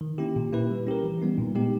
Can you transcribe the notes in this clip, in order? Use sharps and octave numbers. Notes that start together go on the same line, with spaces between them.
D#3
A#3 C#4 E4 G4
A#2
A#3 E4 G4 B4
G3
C#4 G4 A#4
E3
G3 B3 D#4
A#2
G#3 B3 D#4 G4